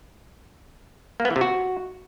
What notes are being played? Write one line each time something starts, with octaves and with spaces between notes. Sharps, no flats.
A#3
B3
E3
C3
F#4